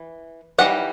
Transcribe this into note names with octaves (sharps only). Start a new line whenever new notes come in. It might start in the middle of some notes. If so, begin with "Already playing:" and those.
Already playing: E3
E3 G3 D#4 F#5